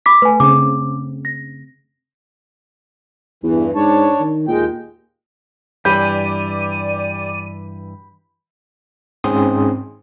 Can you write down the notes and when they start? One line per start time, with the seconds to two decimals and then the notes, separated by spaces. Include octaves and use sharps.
0.06 B5 D6 B6
0.22 A3 B4 G#5
0.40 C#3 C4 G#4 D6
1.25 A#6
3.44 E2 G2 E3
3.75 G#2 D4 C#5 A5
4.20 D#3
4.48 D#2 A#2 G#3 G5
5.85 G2 E3 G4 D5 B5 G6 D#7
9.24 G#2 C4 C#4 G#4 C6 D#6